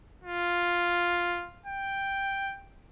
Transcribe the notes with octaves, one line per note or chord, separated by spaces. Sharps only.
F4
G5